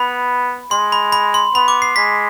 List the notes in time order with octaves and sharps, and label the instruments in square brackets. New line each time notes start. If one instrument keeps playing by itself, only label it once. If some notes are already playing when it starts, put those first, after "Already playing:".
Already playing: [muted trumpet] B3 [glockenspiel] B5
[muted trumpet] G#3 [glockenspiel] C6
[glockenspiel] B5
B5
C6
[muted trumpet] B3 [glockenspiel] B5
[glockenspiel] D6
C7
[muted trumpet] G#3 [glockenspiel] B6